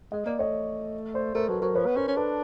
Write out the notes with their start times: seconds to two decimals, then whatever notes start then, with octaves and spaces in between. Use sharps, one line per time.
0.12 G#3 D#5
0.26 A#3 D5
0.39 A3 C#5 D#5
1.14 C5 D5
1.34 A3 A#4 C5
1.48 F#3 A4 B4
1.62 F#3 A#4 C5
1.75 F3 B4 C#5
1.86 B3
1.96 C#4 A#4 C5
2.08 C#4
2.17 D4 A4 B4